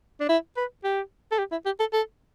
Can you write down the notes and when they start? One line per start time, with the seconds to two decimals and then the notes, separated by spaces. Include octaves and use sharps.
0.20 D4
0.29 E4
0.57 B4
0.84 G4
1.31 A4
1.39 G4
1.52 E4
1.65 G4
1.80 A4
1.93 A4